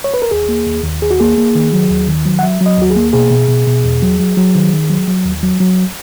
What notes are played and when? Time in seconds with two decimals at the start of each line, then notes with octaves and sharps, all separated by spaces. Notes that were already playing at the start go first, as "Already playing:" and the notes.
0.04 C#5
0.14 B4
0.22 A#4
0.31 D#2 G#4
0.49 A#3
0.67 D#2
0.84 D#2
1.02 D#2 G#4
1.11 F#4
1.20 A#3 G#4
1.38 A#3
1.55 D#3
1.73 F#3
1.90 D#2
2.08 D#3
2.26 F#3
2.39 F#5
2.43 F#3 E5
2.61 F#3
2.66 D#5
2.78 D#2 F#4
2.90 G#4
2.96 A#3
3.13 B2 G#4
3.31 B2
3.49 B2
3.67 B2
3.84 E2
4.02 F#3
4.19 F#3
4.37 F#3
4.55 D#3
4.73 D#3
4.89 F#3
5.08 F#3
5.25 D#2
5.43 F#3
5.60 F#3